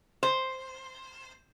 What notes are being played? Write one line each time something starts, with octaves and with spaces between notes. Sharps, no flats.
C5